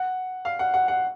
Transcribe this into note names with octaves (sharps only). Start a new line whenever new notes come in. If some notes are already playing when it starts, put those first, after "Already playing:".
Already playing: F#5
F5
F#5
F#5
F#5